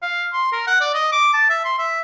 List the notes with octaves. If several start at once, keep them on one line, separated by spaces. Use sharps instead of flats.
F5
C6
A#4
F#5
D5
D#5
D6
A5
E5
C6
E5